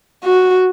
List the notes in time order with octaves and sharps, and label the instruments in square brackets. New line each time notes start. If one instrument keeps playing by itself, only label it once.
[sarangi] F#4